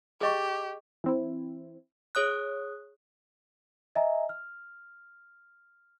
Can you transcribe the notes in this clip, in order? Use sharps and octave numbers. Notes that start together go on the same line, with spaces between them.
G4 G#4 D#5 C#6
E3 C4 E4
G#4 C#5 D#6 F#6
D#5 E5 G#5 A#5
F6